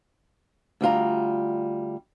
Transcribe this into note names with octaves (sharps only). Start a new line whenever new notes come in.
D2 G3 F4 A#5